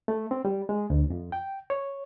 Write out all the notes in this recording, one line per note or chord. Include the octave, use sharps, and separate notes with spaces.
A3
C4
G3
G#3
D2
F2
G5
C#5